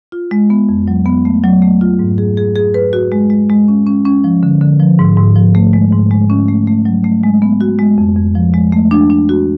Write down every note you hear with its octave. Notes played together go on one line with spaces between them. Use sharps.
F4
G#3
B3
F2
F#3
B3
A3
F#3
A3
F4
G#2
G#4
G#4
G#4
B4
F#4
G#3
G#3
G#3
C#4
C#4
C#4
F3
D3
D3
F3
G#2
G#2
F3
A3
G#3
G#2
G#3
C#4
A3
A3
F#3
A3
G#3
B3
F#4
G#3
F2
F2
F3
G#3
A3
D4
D4
F#4